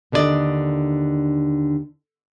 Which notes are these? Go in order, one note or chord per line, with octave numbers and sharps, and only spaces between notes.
D#2 D3 D4 D#4 D5 D#5